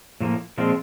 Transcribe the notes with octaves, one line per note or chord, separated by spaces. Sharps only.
A2 F3 A#3
A#2 F3 G#3 C4 F4